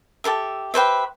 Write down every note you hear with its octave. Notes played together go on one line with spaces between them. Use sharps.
G4 A4 A#4 E5
G4 B4 C5 E5